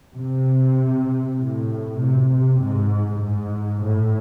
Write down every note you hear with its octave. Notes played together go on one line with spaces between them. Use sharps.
C3
A2
C3
C3
G#2
G#2
A2